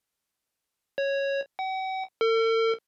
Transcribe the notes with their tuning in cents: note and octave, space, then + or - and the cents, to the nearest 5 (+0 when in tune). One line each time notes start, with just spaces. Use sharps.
C#5 -5
F#5 +45
A4 +45